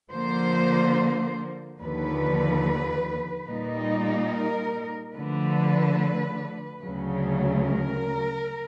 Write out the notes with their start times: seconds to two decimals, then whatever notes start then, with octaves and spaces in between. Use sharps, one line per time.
0.12 D3 F3 A#3 C5
1.80 D#2 D3 F3 B4
3.47 A#2 G3 A#3 D#4
4.30 A#4
5.14 D3 F3 A3 B4
6.81 D2 C#3 F#3
7.65 A#4